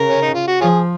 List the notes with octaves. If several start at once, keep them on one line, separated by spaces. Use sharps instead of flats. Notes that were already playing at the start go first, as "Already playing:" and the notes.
Already playing: C#3 A#4
C#4
D#4
F4
F#4
F3 C#4 F4 G#4